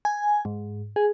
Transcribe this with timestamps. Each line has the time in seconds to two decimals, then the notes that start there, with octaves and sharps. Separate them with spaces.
0.05 G#5
0.45 G#2
0.96 G#4